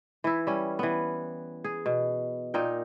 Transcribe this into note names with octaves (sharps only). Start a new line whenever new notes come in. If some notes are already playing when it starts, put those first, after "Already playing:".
E3 E4
G3 C#4
E3 B3
G#4
B2
A#2 D#4 A#4 G5